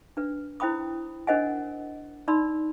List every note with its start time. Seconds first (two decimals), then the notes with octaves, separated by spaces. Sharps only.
0.17 D4 B4
0.60 E4 C5 G5 B5 D#6
1.27 D4 A#4 C5 D#5 F#5 G#5
2.28 D#4 D5 B5 C6 E6